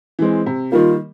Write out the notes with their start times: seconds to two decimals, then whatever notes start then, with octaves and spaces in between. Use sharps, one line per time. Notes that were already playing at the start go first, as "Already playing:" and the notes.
0.19 E3 G#3 C4
0.46 C3
0.72 D#3 G3 A#3 F4